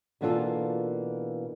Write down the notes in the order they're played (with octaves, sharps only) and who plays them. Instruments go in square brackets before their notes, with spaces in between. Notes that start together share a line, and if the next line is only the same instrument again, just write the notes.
[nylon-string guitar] B2 E3 A#3 D4 F4 A4